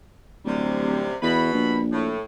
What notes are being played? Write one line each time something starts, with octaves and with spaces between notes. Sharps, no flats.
D1 F#2 C3 G3
E2 B2 B5
A#1
A2